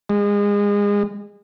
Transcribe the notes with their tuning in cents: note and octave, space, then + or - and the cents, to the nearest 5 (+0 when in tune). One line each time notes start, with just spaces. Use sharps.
G#3 -30